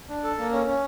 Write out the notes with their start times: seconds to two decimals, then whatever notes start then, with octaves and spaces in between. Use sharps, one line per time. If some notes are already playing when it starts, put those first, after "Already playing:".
0.09 D4
0.24 A4
0.38 A#3
0.52 C#4
0.67 C#4